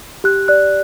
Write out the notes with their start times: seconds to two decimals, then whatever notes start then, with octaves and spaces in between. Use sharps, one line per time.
0.24 G4 F#6
0.48 D5 F#6